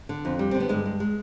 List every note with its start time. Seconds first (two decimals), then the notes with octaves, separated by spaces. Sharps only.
0.09 D3
0.25 F2
0.39 G3
0.51 D3 C4
0.60 B3
0.69 G2 G#3
0.86 G#3
1.00 G#3